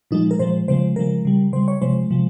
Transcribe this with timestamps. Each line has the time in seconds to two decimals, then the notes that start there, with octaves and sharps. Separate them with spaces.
0.11 A#2 F3 G#3 D#4
0.31 A#4
0.39 A#2 F3 G#3 C5
0.68 C#3 F3 G#3 C5
0.96 C#3 F3 G#3 A#4
1.25 C#3 G3
1.53 C#3 G3 C5
1.68 C#5
1.82 C3 F3 G#3 C5
2.10 C3 F3 G#3